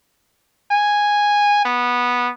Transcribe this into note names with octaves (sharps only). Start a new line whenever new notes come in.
G#5
B3